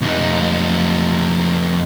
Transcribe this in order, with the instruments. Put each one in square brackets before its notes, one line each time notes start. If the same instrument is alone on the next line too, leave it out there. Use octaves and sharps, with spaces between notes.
[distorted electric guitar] F2 D#4